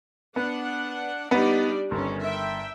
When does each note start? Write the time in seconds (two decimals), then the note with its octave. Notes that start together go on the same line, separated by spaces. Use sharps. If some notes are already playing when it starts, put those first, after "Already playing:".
0.36 B3 D4 F#5
1.31 G3 B3 D4 D#4 D5
1.91 G1 D#3 C#4
2.22 E5 G5